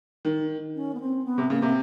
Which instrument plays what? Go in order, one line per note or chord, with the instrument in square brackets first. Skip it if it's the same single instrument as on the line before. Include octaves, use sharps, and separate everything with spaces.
[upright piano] D#3
[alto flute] C#4
B3
C4
B3
[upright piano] C3
[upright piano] C#3 [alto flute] A#3
[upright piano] C3